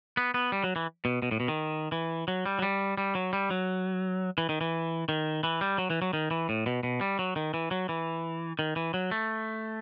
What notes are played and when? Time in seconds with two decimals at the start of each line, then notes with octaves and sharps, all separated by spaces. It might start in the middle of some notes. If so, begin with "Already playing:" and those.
0.17 B3
0.34 B3
0.52 G3
0.64 F#3
0.76 E3
1.05 B2
1.22 B2
1.31 A2
1.40 B2
1.48 D#3
1.92 E3
2.28 F#3
2.46 G3
2.59 F#3
2.62 G3
2.98 G3
3.15 F#3
3.33 G3
3.50 F#3
4.38 E3
4.49 D#3
4.61 E3
5.09 D#3
5.43 E3
5.61 G3
5.78 F#3
5.90 E3
6.02 F#3
6.13 D#3
6.31 E3
6.49 A2
6.66 B2
6.83 B2
7.01 G3
7.19 F#3
7.36 D#3
7.54 E3
7.71 F#3
7.89 E3
8.59 D#3
8.76 E3
8.94 F#3
9.11 A3